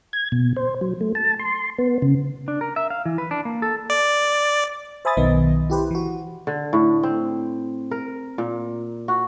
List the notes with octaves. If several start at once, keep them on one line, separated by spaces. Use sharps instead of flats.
G#6
B2
C5
F#3
A3
A5
C6
B3
C#3
D4
A#4
E5
F5
E3
B4
D4
A#3
A4
D5
C5 E5 G#5 B5 D#6 A6
B1 D#3 B3 D#5
E4 G4 B4 C5
E3 F#4
D3
A2
C4
A#4
A#2
F#4